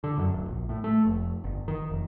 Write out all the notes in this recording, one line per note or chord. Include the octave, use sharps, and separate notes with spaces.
D3
F#2
D1
A#1
A2
A3
F1
G1
D#3
F1